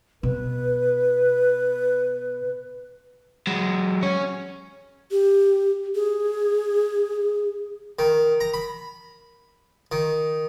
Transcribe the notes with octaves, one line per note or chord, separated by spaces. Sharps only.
B2 B4
F#3 G#3
C#4 C#5
G4
G#4
D#3
A#5
B5
D#3